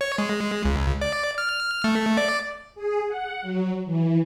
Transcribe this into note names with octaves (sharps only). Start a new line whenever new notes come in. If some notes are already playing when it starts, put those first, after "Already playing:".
C#5
G#3
C#2
D5
F6
A3
D5
G#4
F#5
F#3
E3